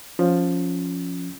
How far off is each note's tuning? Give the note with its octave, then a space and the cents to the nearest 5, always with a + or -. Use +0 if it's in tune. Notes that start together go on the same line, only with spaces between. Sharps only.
F3 +10 C#4 +0